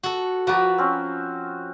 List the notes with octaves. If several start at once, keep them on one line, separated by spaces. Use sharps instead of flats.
F#4 A4
F3 F#4 A#4 B4 D5
C4 C#4